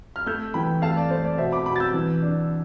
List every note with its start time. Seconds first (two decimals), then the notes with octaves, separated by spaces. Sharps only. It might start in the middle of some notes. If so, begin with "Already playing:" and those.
0.16 F6
0.26 A3 E6 G6
0.54 E3 G5 B5
0.82 A3 F5 A5
0.96 D5
1.10 A3 C5
1.24 D5
1.38 B2 C5 E5
1.52 B5 D6
1.66 B2 B5 D6
1.76 A6
1.80 E6 G6
1.94 E3
2.22 D4